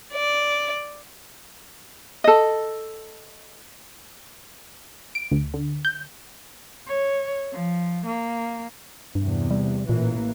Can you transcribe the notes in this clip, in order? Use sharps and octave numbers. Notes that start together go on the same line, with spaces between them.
D5
A4 D#5
D7
D2
D3
G6
C#5
F3
A#3
E2 G2 C3
G3
A1 A#2 E3 A#3